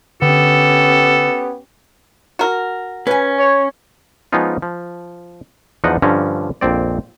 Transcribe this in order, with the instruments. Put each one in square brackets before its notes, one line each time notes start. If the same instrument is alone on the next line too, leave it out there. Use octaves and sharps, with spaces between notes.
[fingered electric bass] D3 [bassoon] B3 [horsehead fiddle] C#4 G4 [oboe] A4
[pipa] F#4 A#4
[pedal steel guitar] C#4 [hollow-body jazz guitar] B4 G#5
[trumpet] C#5
[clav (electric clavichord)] F3 G#3 B3 C#4 D#4 F4
F3
E2 F3 D4 D#4 D#5 F#5
G2 D3 F3 C#4 A#5
A#1 F2 C4 D5